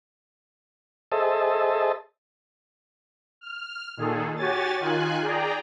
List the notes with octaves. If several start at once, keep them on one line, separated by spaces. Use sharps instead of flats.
G#4 A4 C5 D#5 E5 A5
F6
A#2 D#3 G#4 A4
F#4 G4 C#5 G#5 A6
D#3 F4 G#5 F#6
G#4 D5 G5 A#5